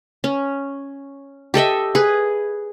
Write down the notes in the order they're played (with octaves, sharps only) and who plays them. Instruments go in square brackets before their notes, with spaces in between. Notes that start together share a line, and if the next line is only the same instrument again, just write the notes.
[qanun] C#4
G4 A4 D#5 E5
G#4 B4